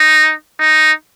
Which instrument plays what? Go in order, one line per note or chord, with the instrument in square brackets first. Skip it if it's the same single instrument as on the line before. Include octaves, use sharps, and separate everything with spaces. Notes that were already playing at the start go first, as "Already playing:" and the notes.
Already playing: [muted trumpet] D#4
D#4